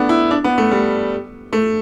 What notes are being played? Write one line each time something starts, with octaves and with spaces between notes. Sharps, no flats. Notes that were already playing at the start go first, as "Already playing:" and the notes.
Already playing: A3 B3 D4
E4
D4
B3
A3
G3
A3